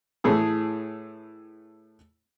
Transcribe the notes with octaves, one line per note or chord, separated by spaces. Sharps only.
A2 E3 G#4 A4